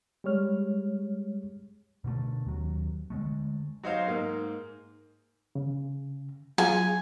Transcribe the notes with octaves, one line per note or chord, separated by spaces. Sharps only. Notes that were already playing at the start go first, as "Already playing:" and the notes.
G3 G#3 C#5 F6
B2 D3 F#3 A3
D#2 F#3
D3 G#3 A3
F#3 D#4 C5 F5
G#2 A#3
C#3
F#3 F4 G#4 G#5